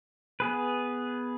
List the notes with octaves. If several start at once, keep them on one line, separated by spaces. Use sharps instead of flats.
B3 G#4 B4